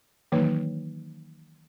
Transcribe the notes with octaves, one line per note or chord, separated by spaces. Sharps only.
D#3 E3 F#3 A#3 D#4 B4